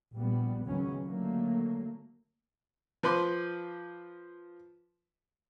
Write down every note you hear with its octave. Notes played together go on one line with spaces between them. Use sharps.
A#1 G3 B3
C#2 F#2 D#3 F#3 B3 C#4
D3 F#3 A3 A#3
F3 B4 C6 D6 F#6